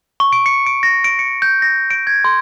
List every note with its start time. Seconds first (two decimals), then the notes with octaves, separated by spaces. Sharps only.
0.20 C#6
0.33 D7
0.46 C#7
0.67 D7
0.83 A#6
1.04 D7
1.19 C#7
1.42 G6
1.62 A#6
1.91 D7
2.07 G#6
2.25 C6